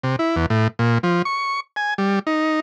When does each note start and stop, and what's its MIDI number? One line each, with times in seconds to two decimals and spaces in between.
0.03 0.16 48
0.19 0.36 64
0.36 0.46 40
0.50 0.68 45
0.79 0.98 46
1.03 1.22 53
1.25 1.60 85
1.76 1.94 80
1.98 2.19 55
2.27 2.60 63